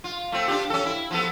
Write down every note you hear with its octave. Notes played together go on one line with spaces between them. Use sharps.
F4
A3 C4
D4 F4 G4
C#4 A4
E4
F3 B3 A4